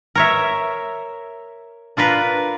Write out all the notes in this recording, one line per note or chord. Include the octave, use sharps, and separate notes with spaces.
A#4 C#5 E5
D4 F4 A#4 B4